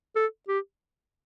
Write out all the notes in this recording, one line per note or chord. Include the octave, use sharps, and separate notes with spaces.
A4
G4